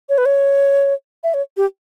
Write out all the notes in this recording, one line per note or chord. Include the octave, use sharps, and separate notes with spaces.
C#5
B4
C#5
E5
C#5
G4